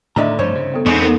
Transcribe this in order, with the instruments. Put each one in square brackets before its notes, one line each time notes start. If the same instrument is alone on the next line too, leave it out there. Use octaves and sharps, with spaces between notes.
[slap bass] A2 [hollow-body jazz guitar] D3 D#3 A#5 [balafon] D4 D#5 E5
[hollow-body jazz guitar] C2 C5 C#5 [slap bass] G2 F3 A3
[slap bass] C#3
[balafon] B3 A4
[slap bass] E2 [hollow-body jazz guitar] G#3 [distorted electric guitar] B3 C4 [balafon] D#4 G#5 C#6
[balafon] D#4 A4 A#4